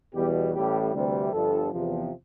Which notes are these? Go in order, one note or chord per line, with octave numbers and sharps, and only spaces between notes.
E2 B2 G3 G4
A1 A2 G3 G4
D2 C3 E3 G3
G1 G2 F3 A4
E2 C3 F3